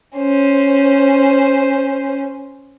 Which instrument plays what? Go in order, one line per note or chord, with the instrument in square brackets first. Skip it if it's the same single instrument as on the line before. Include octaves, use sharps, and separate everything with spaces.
[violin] C#4 C5